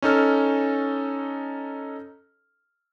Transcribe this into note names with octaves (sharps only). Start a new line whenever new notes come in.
C#4 D#4 A4 F6